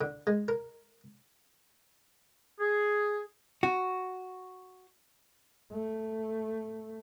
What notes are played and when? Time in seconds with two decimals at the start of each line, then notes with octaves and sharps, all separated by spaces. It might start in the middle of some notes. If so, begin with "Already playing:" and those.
0.01 D3
0.27 G#3
0.48 A#4
2.60 G#4
3.63 F#4
5.73 A3